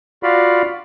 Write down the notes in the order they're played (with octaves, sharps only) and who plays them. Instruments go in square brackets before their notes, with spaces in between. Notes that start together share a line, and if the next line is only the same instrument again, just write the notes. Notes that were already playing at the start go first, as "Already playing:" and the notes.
[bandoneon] F4 F#4 D5 F5 B5